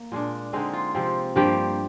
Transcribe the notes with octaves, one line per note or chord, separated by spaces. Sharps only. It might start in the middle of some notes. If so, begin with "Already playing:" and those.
Already playing: A#3
A#2 G#3 D4
D3 G#3 C4 D#4
F4
C3 F3 C4
G2 F3 A#3 G4